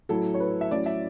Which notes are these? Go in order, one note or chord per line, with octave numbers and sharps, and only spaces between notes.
A2 F#3 A3 E4 A4
C#5
B4
E5
A2 F#3 C#4 E4 D5
E5